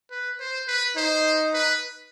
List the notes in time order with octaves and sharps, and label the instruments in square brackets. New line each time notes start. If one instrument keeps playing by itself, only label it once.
[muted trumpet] B4
C5
B4
[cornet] D#4 [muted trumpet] C5
[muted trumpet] B4